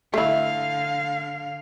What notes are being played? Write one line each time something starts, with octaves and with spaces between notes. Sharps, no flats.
D3 A3 E4 F5